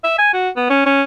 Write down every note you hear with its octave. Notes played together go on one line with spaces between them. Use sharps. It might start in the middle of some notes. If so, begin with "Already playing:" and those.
E5
G#5
F#4
B3
C#4
C#4